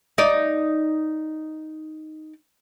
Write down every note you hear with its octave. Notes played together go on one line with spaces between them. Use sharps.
D#4 D5